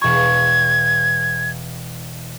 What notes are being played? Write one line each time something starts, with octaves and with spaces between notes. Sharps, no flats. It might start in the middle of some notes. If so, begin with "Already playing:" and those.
E1 C#6 G#6